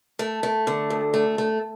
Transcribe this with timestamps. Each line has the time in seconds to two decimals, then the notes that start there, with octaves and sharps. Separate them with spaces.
0.19 A3
0.43 A3
0.67 D3
0.90 D2
1.14 A3
1.38 A3